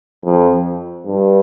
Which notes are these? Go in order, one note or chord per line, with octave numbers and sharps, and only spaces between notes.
F2
G2